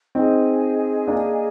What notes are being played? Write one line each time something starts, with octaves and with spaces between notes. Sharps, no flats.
C4 D#4 G#4 D#5 G#5
A#3 D4